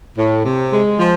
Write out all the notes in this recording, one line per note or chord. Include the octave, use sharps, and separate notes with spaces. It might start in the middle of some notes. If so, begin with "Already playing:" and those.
A2
C3
G#3
F3